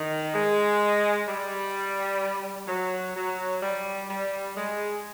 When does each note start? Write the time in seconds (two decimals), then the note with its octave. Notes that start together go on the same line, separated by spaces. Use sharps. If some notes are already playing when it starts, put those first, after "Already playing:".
Already playing: D#3
0.34 G#3
1.27 G3
2.68 F#3
3.16 F#3
3.62 G3
4.09 G3
4.56 G#3